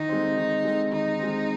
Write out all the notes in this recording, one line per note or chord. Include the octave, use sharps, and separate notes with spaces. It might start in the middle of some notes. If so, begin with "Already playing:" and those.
Already playing: D#3 D#4
G#3 C4
D#3
G#3 C4
D#3 D#4
G#3 C4